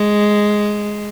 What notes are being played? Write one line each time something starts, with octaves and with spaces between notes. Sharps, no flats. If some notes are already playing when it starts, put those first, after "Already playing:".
Already playing: G#3